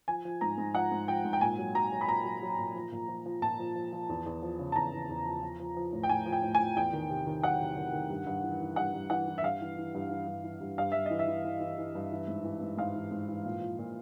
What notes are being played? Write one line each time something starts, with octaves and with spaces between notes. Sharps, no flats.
F3 G#5
F3
G#2 A#5
G#2
F3 F#5
G#2
F3 G5
G#2
G5
A#2 G#5
F#3
F#3 A#5
F#3
B5
A#2 A#5
F#3
F#3
A#2
F3
A#2
F3
F3
A#2 A5
F3
F3
F3
E2
E2
F3
C#3
A5
E2 A#5
E2
E2
F3
F3
F3
F3
A2
G5
A2 G#5
F3
G5
A2
G#5
F3
E2 G5
D#3
C3
D#3
F#3 F#5
C3
D#3
D#3
G2
G2
E3
E3
G2 F#5
G2
E3 F#5
E3
E5
G2 F5
E3
E3
G2
E3
G2
E3
G2
G2 F5
G2 E5
E3 D#5
E5
E3
E3
E3
E3
G2
E3
G#2
E3
G#2
G#2 F5
E3
G#2
E3
A#2
F3
A#2